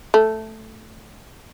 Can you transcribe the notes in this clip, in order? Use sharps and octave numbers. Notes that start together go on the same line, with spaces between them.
A3